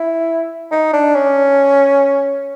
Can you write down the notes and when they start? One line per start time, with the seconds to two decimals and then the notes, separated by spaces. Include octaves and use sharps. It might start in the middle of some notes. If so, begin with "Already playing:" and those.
Already playing: E4
0.71 D#4
0.93 D4
1.15 C#4